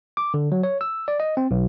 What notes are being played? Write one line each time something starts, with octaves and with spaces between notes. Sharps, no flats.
D6
D3
F#3
C#5
E6
D5
D#5
C4
B1